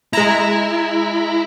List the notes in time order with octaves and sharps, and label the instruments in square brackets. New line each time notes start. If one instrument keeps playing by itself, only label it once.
[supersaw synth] G#3 A#5 [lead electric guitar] E4